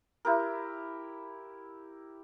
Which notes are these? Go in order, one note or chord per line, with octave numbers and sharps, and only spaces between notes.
E4 G4 A#4